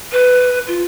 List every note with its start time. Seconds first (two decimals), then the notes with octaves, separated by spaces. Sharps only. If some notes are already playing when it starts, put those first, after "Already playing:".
0.12 B4
0.68 F4